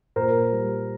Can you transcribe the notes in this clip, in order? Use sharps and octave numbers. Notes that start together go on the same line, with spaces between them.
A#2 A#4 C5
G3